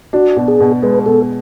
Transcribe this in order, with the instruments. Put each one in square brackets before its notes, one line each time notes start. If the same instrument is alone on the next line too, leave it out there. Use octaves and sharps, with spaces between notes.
[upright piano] D4 [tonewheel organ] F#4
[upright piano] B2
[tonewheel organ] G#4
[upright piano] B2
[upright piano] G#3 [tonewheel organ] B4
[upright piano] B2 [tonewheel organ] A4